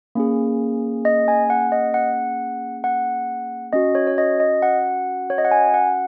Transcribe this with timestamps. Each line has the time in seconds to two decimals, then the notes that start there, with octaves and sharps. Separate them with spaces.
0.15 A#3 C#4 G#4
1.05 D#5
1.28 G#5
1.50 F#5
1.72 D#5
1.94 F#5
2.84 F#5
3.73 C#4 F#4 D#5
3.95 C#5
4.07 C#5
4.18 D#5
4.40 D#5
4.62 F#5
5.30 C#5
5.38 D#5
5.45 F#5
5.51 G#5
5.74 F#5